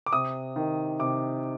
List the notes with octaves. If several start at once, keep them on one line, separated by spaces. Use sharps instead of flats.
D6
C3 D#6
D#3
C3 D6